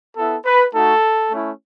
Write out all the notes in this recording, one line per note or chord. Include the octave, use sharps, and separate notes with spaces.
B3 E4 A4
B4
A3 D#4 F#4 A4
A3 C#4 E4